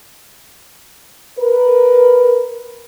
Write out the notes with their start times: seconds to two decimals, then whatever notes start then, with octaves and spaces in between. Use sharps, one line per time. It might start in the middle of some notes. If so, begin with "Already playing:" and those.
1.39 A#4 B4